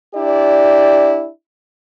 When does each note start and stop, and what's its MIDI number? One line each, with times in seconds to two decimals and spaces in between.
0.15 1.28 62
0.15 1.28 64
0.15 1.28 67
0.15 1.28 74